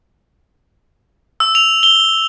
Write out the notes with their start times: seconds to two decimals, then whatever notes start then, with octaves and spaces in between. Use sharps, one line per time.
1.40 E6
1.55 F7
1.83 G7